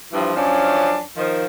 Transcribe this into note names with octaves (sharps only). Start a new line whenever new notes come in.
G2 E3 F3
F#2 F3 C#4 D4
D#3 F3